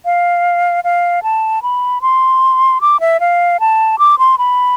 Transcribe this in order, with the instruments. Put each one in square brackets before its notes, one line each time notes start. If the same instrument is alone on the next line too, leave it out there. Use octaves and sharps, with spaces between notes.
[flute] F5
F5
A5
B5
C6
D6
E5
F5
A5
D6
C6
B5